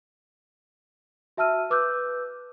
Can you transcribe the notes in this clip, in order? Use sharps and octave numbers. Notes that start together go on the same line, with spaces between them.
F#4 E5 A5 E6 F6 D#7
B4 D6 E6 F#6 G6